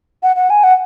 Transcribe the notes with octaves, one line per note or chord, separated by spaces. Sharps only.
F#5
F#5
G#5
F#5